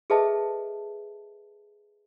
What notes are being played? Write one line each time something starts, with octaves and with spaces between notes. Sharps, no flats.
G#4 A4 B4 D#5 E5 A5